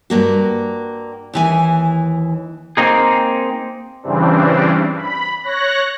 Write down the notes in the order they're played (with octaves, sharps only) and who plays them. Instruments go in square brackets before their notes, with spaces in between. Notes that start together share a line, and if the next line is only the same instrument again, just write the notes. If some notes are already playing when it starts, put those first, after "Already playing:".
[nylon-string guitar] G2 A#3 F#4
D#2 E3 G#5
[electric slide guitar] A#3 C4 D#4 G#4
[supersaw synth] G2 C#3 E3 G3 C4 D4
B5
C#5 F#6 A#6